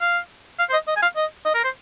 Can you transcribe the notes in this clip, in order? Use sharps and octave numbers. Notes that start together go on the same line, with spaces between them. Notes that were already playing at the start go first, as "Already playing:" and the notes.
F5
F5
C5
D#5
D#5
G#5
F5
D#5
D#5
A#4
C5